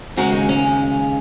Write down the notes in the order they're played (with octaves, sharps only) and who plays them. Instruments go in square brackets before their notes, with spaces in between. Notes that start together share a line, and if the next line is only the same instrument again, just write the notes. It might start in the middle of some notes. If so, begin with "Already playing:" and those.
[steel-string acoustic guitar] D#2 C#3 G#3 C#4 F#4 A#4
D#4
C#4